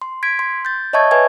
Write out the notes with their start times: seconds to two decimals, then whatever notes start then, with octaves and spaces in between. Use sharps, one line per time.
0.02 C6
0.23 G#6 B6 D7
0.39 C6
0.65 G6 A6
0.93 C#5 D#5 E5 A5 C#6 G#6
1.11 B4 C#5 E5 G#5 G#6